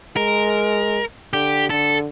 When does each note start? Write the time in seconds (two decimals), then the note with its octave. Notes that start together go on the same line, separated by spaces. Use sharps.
0.16 G#3 A#4
1.33 D3 G4
1.70 D3 A4